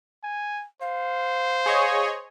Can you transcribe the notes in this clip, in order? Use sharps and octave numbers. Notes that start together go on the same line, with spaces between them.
G#5
C5 F5
G#4 C#5 D#5